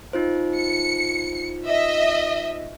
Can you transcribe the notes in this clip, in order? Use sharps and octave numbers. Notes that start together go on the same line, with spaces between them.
D#4 F4 C5
C#7
D#5 E5